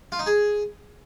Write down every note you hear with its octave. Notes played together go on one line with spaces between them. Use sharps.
F4
D#4
G#4